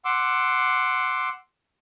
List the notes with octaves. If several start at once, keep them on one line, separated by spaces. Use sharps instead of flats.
F#5 C6 D6 E6